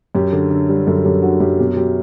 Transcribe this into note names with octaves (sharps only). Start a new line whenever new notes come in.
F#2 G4
D3
D3 A4
G3
F#2 A4
F#2 G4
D3 F#4
F#2 G4
B2 G4
F#3 G4